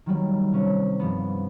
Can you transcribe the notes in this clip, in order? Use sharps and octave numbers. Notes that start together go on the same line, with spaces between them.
D#3 F#3 G3 A#3
C3 C#4
G2 F3 B3